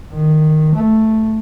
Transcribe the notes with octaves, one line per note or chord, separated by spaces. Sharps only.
D#3
A3